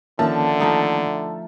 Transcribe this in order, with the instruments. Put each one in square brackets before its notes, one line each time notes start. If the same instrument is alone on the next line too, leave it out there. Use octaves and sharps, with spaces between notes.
[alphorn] D3 [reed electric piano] D#3 A#3 C#4 [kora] F3 [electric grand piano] E5 A5
[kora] F3 A3 D#4